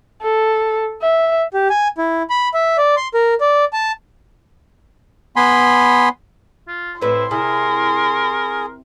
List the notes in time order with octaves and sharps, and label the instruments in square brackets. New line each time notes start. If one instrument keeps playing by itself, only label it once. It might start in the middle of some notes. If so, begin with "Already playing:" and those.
[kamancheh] A4
E5
[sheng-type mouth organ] G4
G#5
E4
B5
E5
D5
C6
A#4
D5
A5
[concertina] B3 G#5 B5 C6
[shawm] F4
[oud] A2 C4 B4 [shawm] E4 [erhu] C6
[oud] C3 E4 [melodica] G#4 [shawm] A#4